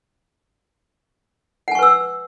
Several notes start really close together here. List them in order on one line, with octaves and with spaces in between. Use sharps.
F#5 G#5 C#6 B4 E6